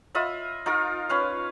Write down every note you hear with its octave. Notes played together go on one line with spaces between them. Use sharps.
F4 D#5 E5 B5
D#4 F4 A#4
C#4 B4 F5